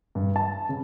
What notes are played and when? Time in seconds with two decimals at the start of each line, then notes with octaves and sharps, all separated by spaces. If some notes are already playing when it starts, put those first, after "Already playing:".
0.15 G2
0.36 A5
0.69 C#3